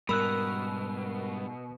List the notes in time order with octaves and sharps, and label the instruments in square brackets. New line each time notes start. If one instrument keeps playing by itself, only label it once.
[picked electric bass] G#2 G3 [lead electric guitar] B2 [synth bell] A#4 [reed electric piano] B5 E6 F#6